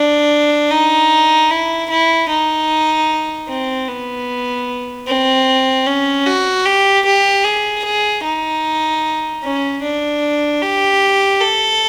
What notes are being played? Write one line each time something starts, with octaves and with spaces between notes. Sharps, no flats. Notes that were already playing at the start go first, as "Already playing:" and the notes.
Already playing: D4
D#4
E4
E4
D#4
C4
B3
C4
C#4
F#4
G4
G4
G#4
G#4
D#4
C#4
D4
G4
A4